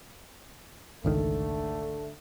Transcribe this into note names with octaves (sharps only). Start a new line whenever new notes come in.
G#1 C#2 D3 D#3 A3